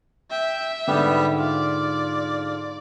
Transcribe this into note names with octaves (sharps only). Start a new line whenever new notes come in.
E5 G5
G#2 D3 G3 B3 G4
F4 D5